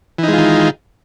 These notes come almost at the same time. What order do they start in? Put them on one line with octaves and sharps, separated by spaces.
E3 D#4 G#3 F4 D#3